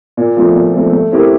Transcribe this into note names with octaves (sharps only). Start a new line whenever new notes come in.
A#2
F3 A3 C4
A#2
F3 A3 C4
A3
C4 E4 G4 A#4